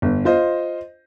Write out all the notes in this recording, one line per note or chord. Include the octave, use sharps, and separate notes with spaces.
G1
F4 C5 D#5